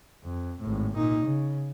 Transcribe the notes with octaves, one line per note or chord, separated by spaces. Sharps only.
F2
G#1 A2
A#2 D#4
C#3